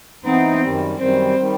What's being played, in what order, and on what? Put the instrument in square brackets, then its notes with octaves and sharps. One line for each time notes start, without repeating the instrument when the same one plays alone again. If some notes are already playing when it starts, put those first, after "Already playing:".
[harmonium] E3 B3 D#4 [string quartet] C4
[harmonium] F#2 D#3 G3
[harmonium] F#2 D#3 G3 [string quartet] C4
[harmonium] D#3 G3